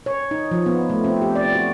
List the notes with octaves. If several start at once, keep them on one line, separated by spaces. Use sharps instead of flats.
C#5
D#4
F3
B3
A3
C4
G4
D5
F#4